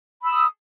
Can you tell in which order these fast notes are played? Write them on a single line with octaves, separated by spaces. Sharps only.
B5 E6 D#6